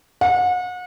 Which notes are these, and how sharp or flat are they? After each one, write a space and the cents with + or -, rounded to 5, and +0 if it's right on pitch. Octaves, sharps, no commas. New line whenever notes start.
F#5 -35